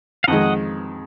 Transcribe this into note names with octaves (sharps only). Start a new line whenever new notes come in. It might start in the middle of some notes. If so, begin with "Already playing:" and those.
F5
F2 D#3 G#3 D#5 F#5